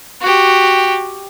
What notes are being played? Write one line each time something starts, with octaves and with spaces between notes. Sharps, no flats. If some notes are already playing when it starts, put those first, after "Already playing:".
F#4 G4